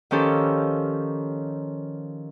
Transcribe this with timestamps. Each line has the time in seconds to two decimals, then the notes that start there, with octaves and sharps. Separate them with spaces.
0.11 D#3 F3 C#4 G4 A4